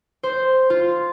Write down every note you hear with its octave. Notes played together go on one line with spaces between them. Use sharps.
C5
F4